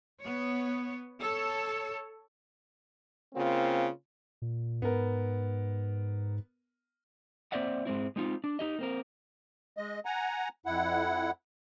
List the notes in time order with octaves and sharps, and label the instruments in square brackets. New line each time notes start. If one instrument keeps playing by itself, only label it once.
[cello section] B3 C#5
A4 C#5
[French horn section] C#3 A#3 C4 F4
[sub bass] A#2
[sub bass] G#2 [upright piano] B3 A#4
[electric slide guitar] A#3 C4 C5 D5 E5 F#5
G#2 G#3 C4 E4
G#3 C4 D#4 F4
D4
D#4 G4 D#5
A#3 C4 A#4
[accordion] G#3 D#5
F#5 G#5 A#5
F2 E4 F#5